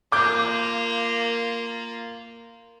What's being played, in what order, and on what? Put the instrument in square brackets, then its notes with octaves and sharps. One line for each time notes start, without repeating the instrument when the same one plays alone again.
[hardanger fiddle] A#3 F4 [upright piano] D6 G6